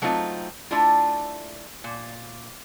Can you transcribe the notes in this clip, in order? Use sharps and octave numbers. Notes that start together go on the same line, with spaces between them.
F#3 A3 C4 D#4 F4
A3 D4 E4 F4
A#2